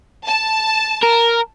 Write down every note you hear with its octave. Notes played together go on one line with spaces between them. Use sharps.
A5
A#4